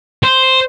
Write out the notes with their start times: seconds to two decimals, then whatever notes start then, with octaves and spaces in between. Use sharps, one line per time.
0.23 C5